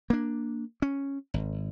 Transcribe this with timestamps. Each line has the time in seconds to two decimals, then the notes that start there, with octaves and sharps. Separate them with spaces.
0.10 A#3 D4
0.82 C#4
1.34 G#1